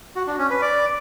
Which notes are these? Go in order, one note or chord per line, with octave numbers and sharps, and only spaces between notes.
F#4
D4
C#4
B4
D5